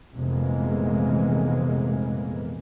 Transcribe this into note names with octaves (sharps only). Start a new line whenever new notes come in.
F1 A#2 E3 G#3 A#3 B3